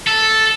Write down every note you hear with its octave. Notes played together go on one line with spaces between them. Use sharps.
A4